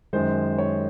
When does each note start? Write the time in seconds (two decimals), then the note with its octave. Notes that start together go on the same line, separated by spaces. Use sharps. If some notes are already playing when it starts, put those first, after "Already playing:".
0.13 F#2 D#3 G#3 C5
0.58 C#5